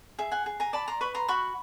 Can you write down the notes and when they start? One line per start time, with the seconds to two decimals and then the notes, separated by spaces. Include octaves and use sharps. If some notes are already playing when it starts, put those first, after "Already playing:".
0.19 G#4 E5
0.31 F#5 G#5
0.46 G#4
0.60 G#5 A#5
0.73 D5 A5 B5
0.88 A#5 C6
1.01 B4 B5 C#6
1.15 A#5 C6
1.28 F#4 B5 C#6